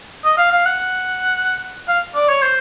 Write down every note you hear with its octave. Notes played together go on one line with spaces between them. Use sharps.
D#5
F5
F5
F#5
F5
D5
C#5
C5